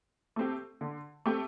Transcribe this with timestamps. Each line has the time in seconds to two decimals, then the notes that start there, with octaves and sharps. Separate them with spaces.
0.36 A3 C4 G4
0.81 D3
1.26 A3 C4 G4